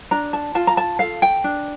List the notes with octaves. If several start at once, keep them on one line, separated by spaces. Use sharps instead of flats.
D4 A#5
A5
F4 A5
A#5
A5
A4 F5
G5
D4